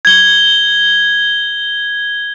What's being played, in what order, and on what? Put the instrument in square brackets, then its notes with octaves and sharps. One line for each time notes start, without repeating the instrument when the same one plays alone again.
[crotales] G#6 G7